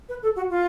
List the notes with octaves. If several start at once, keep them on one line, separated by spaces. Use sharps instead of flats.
B4
A4
F#4
F4